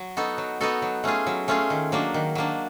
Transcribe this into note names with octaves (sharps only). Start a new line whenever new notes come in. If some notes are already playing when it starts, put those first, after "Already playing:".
Already playing: F#3
B3 D#4 F#4 A4
F#3
B3 D#4 F#4 A4
F#3
A3 C#4 F4 G#4
F#3
A3 C#4 F4 G#4
D#3
F#3 A#3 D4
D#3
F#3 A#3 D4